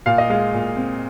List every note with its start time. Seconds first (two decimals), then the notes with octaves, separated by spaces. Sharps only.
0.06 A#2 F5
0.18 D#5
0.30 G#3 F5
0.54 A#2
0.76 C4